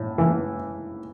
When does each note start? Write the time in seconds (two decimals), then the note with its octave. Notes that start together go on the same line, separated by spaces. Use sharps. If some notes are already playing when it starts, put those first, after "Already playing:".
Already playing: A2
0.18 E3